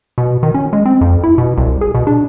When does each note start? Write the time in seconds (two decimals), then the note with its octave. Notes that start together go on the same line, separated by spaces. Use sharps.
0.18 B2
0.43 D#3
0.54 C#4
0.73 G#3
0.85 C4
1.01 F2
1.24 E4
1.38 B2
1.57 C2
1.81 G#4
1.95 B2
2.07 D4